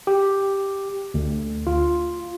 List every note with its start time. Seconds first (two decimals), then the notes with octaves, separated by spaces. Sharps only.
0.07 G4
1.14 D2
1.67 F4